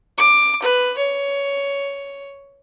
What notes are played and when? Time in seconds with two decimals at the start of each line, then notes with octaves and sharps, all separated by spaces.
0.18 D6
0.63 B4
0.98 C#5